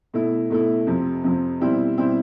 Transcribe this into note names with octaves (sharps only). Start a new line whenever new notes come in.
B2 A3 E4
B2 A3 E4
F2 C3 F3
F2 C3 F3
B2 G3 C4 E4
B2 G3 C4 E4